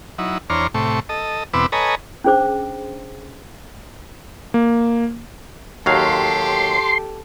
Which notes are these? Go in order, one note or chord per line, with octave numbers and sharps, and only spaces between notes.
F#3 D#4 E4
E2 D4 C5 C#5 A#5 F6
A2 C3 A3 C#6
A4 D#5
E2 B2 C4 B4 D6 E6
A4 B4 C#5 D#5 G#5 A#5
C#4 D4 G#4 C5 D6
A#3
D#2 F#3 G4 A4 F5 C6